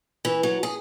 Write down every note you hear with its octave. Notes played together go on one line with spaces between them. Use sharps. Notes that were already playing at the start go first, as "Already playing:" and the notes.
E3
F#3
G#4